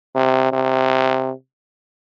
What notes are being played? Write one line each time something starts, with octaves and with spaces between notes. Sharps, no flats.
C3
C3